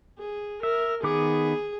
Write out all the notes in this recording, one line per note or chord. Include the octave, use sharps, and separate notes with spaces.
G#4
A#4 E5
D#3 B3 G#4 D6